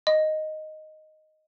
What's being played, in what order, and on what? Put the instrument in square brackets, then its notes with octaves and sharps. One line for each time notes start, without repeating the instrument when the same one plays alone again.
[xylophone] D#5